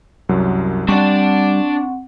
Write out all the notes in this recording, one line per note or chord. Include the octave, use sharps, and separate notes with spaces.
C2 F#2 F#3
G3 C4 D4 D5 F#5 C#6